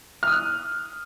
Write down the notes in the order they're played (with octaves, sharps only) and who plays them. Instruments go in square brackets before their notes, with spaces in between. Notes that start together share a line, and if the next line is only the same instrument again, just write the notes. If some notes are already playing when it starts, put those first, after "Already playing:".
[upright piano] F6
D#6
F#6